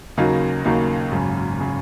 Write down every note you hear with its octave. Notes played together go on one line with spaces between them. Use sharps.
D#2 C#3 F#3 A#3 D#4
D#2 C#3 F#3 A#3 D#4
G#1 F#2 C#3
C#3